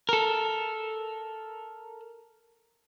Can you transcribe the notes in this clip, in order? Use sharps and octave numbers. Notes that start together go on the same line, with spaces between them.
A4 A#4